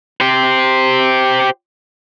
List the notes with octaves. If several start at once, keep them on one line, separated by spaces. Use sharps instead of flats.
G4 C5